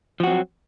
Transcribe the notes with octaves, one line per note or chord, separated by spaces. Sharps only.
F3 F#3 C4 F#4